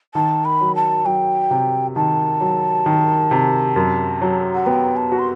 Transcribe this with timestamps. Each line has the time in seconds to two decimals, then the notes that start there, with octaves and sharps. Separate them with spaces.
0.15 D#3 A5
0.45 B5
0.61 F#3
0.75 A5
1.05 F#3 G5
1.51 C3
1.96 D#3 A5
2.41 F#3
2.86 D#3
3.31 C3
3.76 F#2
4.21 F#3
4.55 F#5
4.66 B3 G5
4.96 A5
5.12 F#4
5.19 C6